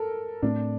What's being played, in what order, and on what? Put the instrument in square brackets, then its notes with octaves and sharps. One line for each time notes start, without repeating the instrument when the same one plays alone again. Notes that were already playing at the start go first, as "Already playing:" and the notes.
Already playing: [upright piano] A4 A#4
[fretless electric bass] A2 A3 C4 [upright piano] D4